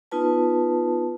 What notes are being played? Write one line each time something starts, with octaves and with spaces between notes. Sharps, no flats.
B3 D#4 F4 B4 A5